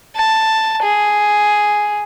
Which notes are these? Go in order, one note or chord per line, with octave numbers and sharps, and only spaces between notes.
A5
G#4